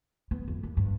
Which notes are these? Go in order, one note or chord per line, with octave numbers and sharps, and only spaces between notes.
B3
F2
D#2
G2